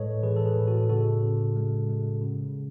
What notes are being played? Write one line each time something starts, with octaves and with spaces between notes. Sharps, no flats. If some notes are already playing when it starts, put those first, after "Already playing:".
Already playing: A2 G#3 A4 B4 C#5 D#5
E3 G#4 B4
A4
G#4 B4
A2
F#4 A4
C#3 F#4 A4
C#3
G#3
G#3
C#3